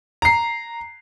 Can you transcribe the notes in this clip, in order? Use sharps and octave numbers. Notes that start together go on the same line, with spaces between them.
A#5 C7